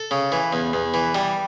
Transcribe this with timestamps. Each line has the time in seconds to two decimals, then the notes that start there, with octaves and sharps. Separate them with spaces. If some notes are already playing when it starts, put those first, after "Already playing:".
Already playing: A4
0.11 C#3
0.32 E3
0.53 E2
0.73 E2
0.94 E3
1.15 G3